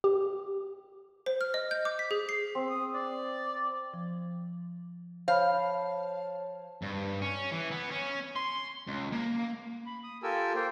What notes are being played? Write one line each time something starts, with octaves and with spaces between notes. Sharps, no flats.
G4
C5
F6
D#5
G6
D6
B6
G#4
C7
C4
D#6
D5
F3
C5 C#5 F5 A5 B5 G6
G2
C#4
E3
B3
C#4
C6
C#2
A#3
B5
D#6
F4 G4 A4 A#4 G#5 E6
A#3 C5 G5